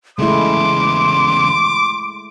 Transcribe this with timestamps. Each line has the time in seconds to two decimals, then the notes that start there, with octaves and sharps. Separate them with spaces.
0.19 E2 C#3 G#3 A3 E4 C6 D6